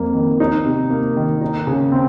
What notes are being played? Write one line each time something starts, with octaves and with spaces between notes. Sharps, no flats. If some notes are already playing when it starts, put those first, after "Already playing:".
Already playing: F2 A#3
D#3
D#4
C3
A#3
D#3
D#4
C#3
C4